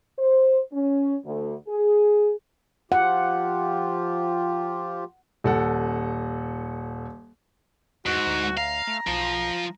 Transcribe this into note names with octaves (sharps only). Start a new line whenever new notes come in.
C5
C#4
D2
G#4
F3 F4 G4 F#5
D#1 A4 F#5
E2 G#2 F#4
D2
F5 A#5
A3
B1 F3